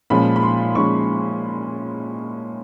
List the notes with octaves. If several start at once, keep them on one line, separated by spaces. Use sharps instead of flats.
A#2 F3 G#3 C#4 B5
B5
C6
A#2 F3 G#3 C#4 C#6